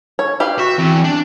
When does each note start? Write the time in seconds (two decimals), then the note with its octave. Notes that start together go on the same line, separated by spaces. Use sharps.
0.19 C#5
0.40 G4 B4 F5
0.59 F#4 E5
0.78 E2 C4
1.04 D4